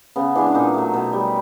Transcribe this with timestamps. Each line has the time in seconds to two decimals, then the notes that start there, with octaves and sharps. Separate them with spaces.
0.16 C#3 B3
0.35 E3 G#3 D4
0.46 D4
0.55 A#2 D#4
0.74 F#3 A3
0.94 B2
1.13 G3